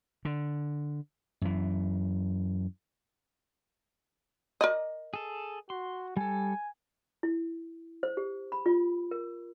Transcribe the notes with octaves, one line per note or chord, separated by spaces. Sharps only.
D3
F#2 E3
A#4 D5 D#5
G#4 A4
F#4 C6
G3 A4 G#5
E4
C5
G4
B5
F4
A#4